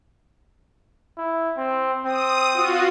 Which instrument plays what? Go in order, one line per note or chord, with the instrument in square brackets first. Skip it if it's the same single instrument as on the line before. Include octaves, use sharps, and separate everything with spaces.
[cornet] E4
C4
[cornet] C4 [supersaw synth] D#6
[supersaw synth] F4 F#4